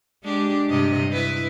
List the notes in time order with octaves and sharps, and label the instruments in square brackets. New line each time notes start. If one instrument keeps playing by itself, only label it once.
[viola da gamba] G#3 D4 G4
G2 C3 D#5
E4 B4